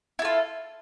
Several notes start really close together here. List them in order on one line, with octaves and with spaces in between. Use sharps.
E4 A4 F4